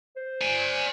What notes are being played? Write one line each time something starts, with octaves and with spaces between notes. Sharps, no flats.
C5
D5 G#5